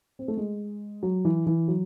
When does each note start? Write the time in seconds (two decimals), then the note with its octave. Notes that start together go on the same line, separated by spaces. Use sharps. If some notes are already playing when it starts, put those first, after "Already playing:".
0.19 C4
0.28 A3
0.37 G#3
1.03 F#3
1.25 E3
1.46 E3
1.68 F#3